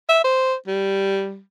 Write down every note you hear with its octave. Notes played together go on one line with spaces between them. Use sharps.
E5
C5
G3